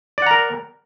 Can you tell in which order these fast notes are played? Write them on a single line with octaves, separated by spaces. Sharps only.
D5 F#5 A#5 A#4